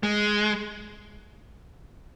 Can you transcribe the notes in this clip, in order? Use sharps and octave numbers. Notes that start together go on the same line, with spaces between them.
G#3